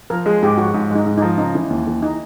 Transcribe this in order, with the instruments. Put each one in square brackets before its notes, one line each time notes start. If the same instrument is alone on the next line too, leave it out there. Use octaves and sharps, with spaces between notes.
[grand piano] F3 [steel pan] A#4
[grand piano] G#3 [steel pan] G#4
[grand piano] G#2 [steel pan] G4
[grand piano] F3 [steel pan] F#4
[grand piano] G#2
[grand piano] G#3 [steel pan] D#4
[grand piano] G#2
[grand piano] F3 [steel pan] D#4
[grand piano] C#3 [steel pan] D#4
[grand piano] E3
D#2
E3
[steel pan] D#4